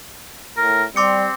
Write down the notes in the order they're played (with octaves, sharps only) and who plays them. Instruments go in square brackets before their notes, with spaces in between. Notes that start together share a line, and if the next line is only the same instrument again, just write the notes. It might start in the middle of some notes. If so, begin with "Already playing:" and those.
[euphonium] A2 [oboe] A#4
[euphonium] G3 [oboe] C4 [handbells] C6 D6 C#7